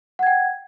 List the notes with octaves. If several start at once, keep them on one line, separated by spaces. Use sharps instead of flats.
F#5 G5 G#6